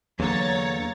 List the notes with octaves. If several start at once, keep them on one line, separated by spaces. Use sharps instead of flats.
E2 D3 F#3 A#3 C#5 A#5 A6